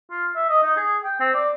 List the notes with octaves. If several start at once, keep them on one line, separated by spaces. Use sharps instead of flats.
F4
E5
D#5
D#4
G#4
G5
C4
D5